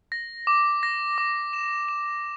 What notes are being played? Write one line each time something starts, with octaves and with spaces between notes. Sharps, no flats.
A#6
D6
A#6
D6
E7
E7